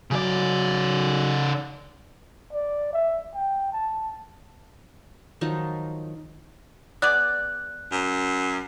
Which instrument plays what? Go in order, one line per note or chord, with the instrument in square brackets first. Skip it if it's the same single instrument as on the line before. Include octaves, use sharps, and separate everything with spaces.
[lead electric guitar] C#3 D5 [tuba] F#3
[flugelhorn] D5
E5
G5
A5
[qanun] D#3 F3 F#3 D#4
[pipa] B3 G#4 D5 [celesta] F#6
[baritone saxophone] F#2